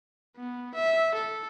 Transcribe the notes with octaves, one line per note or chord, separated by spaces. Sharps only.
B3
E5
A4